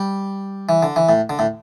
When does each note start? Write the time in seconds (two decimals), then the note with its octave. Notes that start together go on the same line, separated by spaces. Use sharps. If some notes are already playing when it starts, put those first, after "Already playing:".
Already playing: G3
0.69 E3
0.83 D3
0.96 E3
1.09 A2
1.30 D3
1.39 A2